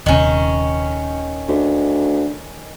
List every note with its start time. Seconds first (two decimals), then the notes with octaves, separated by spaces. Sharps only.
0.06 D#1 C3 D#3 C#4
1.48 D2